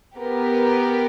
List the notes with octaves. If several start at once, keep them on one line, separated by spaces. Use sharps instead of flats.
B3 G4 A#4